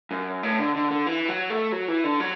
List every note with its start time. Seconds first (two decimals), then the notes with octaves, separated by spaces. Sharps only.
0.11 F#2
0.43 A2
0.59 D3
0.75 D3
0.91 D3
1.07 E3
1.28 F#3
1.50 A3
1.72 F#3
1.88 E3
2.04 D3
2.20 F#3